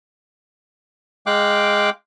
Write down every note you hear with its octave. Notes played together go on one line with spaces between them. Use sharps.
G#3 F5 G5 D6 F#6